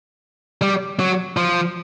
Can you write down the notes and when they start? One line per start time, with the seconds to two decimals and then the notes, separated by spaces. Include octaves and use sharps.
0.62 G3
0.99 F#3
1.37 F3